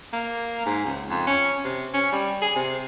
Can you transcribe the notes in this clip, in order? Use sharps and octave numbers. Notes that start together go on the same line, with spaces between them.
A#3
G#2
C#2
F2
C#4
C3
C#4
G3
G#4
C3